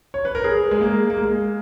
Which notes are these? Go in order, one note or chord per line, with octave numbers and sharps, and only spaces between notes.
C#5
B4
A#4
G#4
G#3
A#3
A#3
G#3